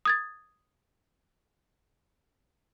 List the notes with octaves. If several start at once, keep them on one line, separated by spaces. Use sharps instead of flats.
D#6 G#6 A6